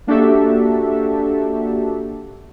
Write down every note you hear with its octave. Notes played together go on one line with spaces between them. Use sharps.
A#3 D4 F#4 G4 A4 E5